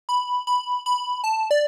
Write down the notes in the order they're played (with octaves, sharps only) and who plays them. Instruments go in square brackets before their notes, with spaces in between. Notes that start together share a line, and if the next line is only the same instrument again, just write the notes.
[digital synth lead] B5
B5
B5
A5
D5